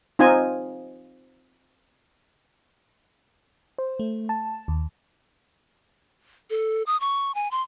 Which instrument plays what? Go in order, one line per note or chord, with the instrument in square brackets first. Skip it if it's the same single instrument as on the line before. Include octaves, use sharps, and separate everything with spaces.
[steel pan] C4 D#4 F4 D#5 G#5
[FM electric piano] C5
A3
A5
D#2
[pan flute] A4
D#6
C#6
G#5
C6